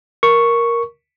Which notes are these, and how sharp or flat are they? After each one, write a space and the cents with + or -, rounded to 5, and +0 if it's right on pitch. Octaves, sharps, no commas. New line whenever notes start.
A#4 +5 C#6 +0